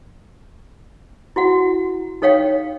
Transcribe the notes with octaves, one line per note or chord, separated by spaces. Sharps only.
E4 F#4 F#5
D#4 A4 C#5 F5 G5